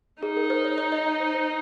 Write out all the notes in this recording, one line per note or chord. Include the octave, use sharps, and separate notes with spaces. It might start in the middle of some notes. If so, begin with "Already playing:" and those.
D#4 G#4
A#4
C5
C#5
C#5
D#5
D#5
C5
C5